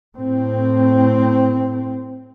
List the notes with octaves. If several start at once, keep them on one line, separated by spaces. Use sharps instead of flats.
A2 C4